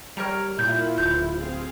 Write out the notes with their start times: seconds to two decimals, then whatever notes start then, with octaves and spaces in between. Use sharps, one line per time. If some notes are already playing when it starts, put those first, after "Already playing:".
0.17 G3 A#4 C#5 A#5
0.59 A#2 E4 F4 G6
0.98 D1 G6
1.39 C4 G#4 F5